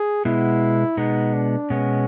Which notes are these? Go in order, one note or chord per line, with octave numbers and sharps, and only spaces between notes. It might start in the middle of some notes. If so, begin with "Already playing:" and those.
Already playing: G#4
B2 G#3 B3 E4
B2 G#3 B3 D#4
D4
B2 G#3 B3 C#4